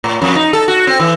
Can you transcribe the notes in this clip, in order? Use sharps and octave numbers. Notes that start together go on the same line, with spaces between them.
A2
F2
D#4
A4
F#4
C4
E3